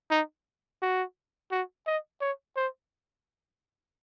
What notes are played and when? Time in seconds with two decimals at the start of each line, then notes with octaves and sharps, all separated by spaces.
0.11 D#4
0.82 F#4
1.51 F#4
1.87 D#5
2.21 C#5
2.56 C5